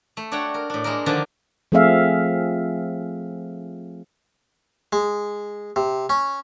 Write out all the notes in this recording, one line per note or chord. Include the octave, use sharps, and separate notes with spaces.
A3
D4 F#4 C#5 F#5 G5
A#4
A2 D4
G#3 A#3 A#4
D3 D#3 F3 D4
F3 A3 C4 G#4 E5 F5
G#3
C3
C#4